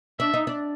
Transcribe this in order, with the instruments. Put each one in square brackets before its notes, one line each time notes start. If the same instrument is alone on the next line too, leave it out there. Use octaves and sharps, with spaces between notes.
[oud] D4 [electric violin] E5
[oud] D#4
D4